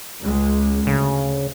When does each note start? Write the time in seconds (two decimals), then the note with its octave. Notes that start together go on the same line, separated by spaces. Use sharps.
0.23 C#2 G#3
0.87 D2 C#3